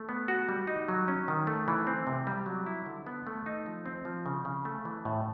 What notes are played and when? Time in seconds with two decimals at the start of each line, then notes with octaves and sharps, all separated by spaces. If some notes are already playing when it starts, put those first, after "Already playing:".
Already playing: A3
0.09 B3
0.28 F#4
0.49 G3
0.67 D#4
0.88 F#3
1.08 C#4
1.28 D#3
1.47 A3
1.68 E3
1.87 C4
2.07 C3
2.27 G3
2.46 F#3
2.66 E4
2.86 D3
3.07 B3
3.27 A3
3.46 D#4
3.66 F3
3.86 C4
4.05 F3
4.26 C#3
4.45 C#3
4.65 A3
4.85 E3
5.05 A2